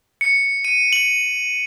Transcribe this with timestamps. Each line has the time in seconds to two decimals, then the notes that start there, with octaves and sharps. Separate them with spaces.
0.21 C#7
0.65 D#7
0.93 F#7